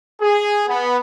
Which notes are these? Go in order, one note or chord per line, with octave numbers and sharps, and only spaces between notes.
G#4
B3